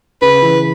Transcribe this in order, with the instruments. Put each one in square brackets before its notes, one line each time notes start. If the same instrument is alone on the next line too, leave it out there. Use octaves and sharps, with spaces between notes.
[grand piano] C#3 [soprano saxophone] B4
[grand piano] E3